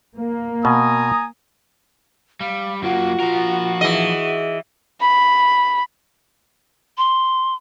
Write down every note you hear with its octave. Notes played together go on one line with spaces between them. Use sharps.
A#3
B2 G#5 A#5 D#6
G3 F5
F#2 A#3 F4 F#4
F3 A#4
E3 G#4 D#5
B5
C6